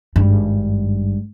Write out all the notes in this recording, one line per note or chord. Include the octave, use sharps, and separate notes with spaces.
G#1 G2